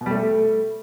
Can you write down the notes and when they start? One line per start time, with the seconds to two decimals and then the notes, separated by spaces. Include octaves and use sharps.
0.01 B2
0.06 G3
0.11 A3